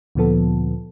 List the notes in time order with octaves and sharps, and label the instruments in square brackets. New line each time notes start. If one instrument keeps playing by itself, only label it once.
[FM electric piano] D2 A#2 F3 B3 A4